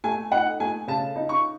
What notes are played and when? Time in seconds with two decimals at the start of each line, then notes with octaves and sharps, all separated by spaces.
0.04 A3 G#5
0.31 D#4 F#5
0.60 A3 G#5
0.88 C#3 A5
1.16 D#4
1.29 C#6